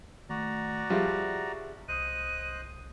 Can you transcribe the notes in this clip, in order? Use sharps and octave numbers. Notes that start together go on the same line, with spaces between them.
D#3 A3 F#4 D5 A#5
F3 G3 G4 G#4 E5
C2 C5 D#5 D#6 F#6 D#7